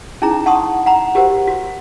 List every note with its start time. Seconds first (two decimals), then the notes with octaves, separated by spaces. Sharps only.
0.22 C#4 D#4 E4 G#4 A#5
0.46 F#5 A5 C6 C#6 D#6
0.86 F#5 A#5 B5
1.15 F#4 G4 A#4 C5 F#5
1.47 F#4